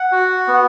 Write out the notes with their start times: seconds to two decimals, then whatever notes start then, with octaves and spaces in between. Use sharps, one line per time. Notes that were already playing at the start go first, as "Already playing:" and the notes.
Already playing: F#5
0.12 F#4
0.48 B3